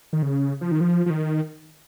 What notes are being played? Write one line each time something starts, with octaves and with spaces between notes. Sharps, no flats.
D#3
C#3
F3
D#3
F3
F3
D#3